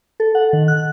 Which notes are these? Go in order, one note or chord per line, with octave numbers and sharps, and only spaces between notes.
A4
F#5
D#3
F#6